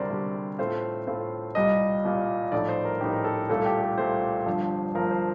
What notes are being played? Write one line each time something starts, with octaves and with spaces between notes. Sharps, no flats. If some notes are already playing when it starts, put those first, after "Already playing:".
Already playing: D2 C3 G3 A#4 C5 D5
D2 C3 G3
A2 A3 C4 F4 C5
A2 A3 C4 F4
C2 A#2 G3 D#5
C2 A#2 G3
A#1 A2 A3 D#4 D5
C5
A#4
A#1 A2 A3 D#4 G4
A#4
A4
C2 A#2 A3 A4
G4
A4
C2 A#2 A3 C5
G1 G2 F3
G1 G2 F3 A#4
C5